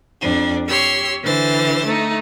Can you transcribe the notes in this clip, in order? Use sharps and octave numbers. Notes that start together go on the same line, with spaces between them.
F2 D4
G4 C#5 C6 E6
D3 E3 C5 A6
A3 D#4